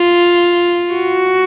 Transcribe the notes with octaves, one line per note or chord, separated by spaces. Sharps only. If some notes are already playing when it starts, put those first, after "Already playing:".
Already playing: F4
F#4